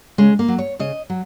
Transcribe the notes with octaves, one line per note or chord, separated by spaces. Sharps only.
C#3 G#3
A#3
F#3
C#5
C#3 D#5
F#3